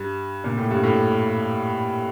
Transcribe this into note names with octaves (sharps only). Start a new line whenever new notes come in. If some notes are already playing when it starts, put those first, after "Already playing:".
Already playing: G2
A#2
A2
G2
A2